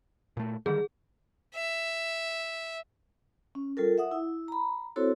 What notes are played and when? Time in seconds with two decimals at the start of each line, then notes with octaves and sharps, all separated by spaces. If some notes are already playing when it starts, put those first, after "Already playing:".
0.37 A#2 A3
0.66 D3 D#3 G3 G#4
1.55 E5
3.55 C#4
3.77 G3 F4 A4 A#4
3.98 E5 F#5 D#6
4.11 E4
4.48 A#5 B5
4.96 C4 E4 F#4 A4 C5 C#5